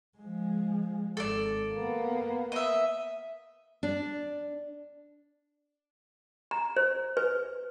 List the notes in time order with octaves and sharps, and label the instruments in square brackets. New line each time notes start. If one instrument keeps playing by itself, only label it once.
[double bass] F3 G#3
[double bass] G#1 [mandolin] A4 D5
[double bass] A#3 B3
[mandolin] D#5 E5
[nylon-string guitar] D4
[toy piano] A#5
C5
B4